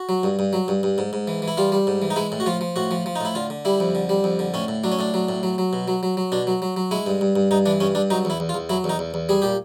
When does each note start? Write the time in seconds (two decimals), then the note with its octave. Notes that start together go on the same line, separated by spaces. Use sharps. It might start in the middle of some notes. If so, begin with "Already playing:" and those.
Already playing: F#4
0.09 F#3
0.23 G2
0.39 G2
0.53 F#3
0.68 G2
0.83 G2
0.98 G#2
1.13 G#2
1.28 E3
1.42 E3
1.48 E4
1.57 G3 F4
1.72 G3
1.87 G#2
2.02 E3
2.10 D#4
2.16 G#3 E4
2.32 A2
2.40 F#4
2.46 F3 F4
2.61 F3
2.76 A2 F#4
2.91 F3
3.06 F3
3.16 D#4
3.21 A2 E4
3.35 D3 F4
3.50 D3
3.65 G3 E4
3.80 F2
3.95 D3
4.09 G3
4.24 F2
4.39 D3
4.54 A2 C#4
4.68 A2
4.84 F#3 D4
4.92 C#4
4.99 A2 D4
5.14 F#3
5.29 A2
5.43 F#3
5.58 F#3
5.73 B2
5.88 F#3
6.03 F#3
6.17 F#3
6.32 B2 D4
6.47 F#3
6.62 F#3
6.77 F#3
6.91 G#3 E4
7.07 G2
7.21 G2
7.36 G2
7.51 G2 D#4
7.66 E3 D4
7.80 G2 C#4
7.95 G2 D4
8.10 F#3 D#4
8.25 E2 E4
8.40 E2
8.49 F4
8.54 E2
8.69 F#3 E4
8.84 E2
8.89 D#4
8.99 E2
9.14 E2
9.29 G3 G#4
9.42 A#2 G4